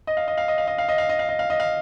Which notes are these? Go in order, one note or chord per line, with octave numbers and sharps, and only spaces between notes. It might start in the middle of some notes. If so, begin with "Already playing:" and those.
D#5
F5
D#5
F5
D#5
F5
D#5
F5
D#5
F5
D#5
F5
D#5
F5
D#5
F5